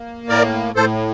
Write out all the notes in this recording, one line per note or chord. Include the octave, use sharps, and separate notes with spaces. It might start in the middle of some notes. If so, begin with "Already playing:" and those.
Already playing: A#3
A2 A#4 D5
A2 A4 C5